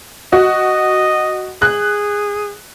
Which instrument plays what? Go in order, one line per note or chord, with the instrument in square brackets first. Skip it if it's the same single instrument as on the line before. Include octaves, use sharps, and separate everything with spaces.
[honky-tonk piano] F#4 [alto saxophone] D#5
[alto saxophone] G#4 [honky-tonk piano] F#6